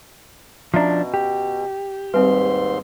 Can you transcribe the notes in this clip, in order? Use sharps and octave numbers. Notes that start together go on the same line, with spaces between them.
B2 F3 C#4 D4 E5 A#5
G4
D#2 G#2 G3 C4 B4 C6